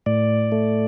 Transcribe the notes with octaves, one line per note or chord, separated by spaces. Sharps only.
A2 D5
A3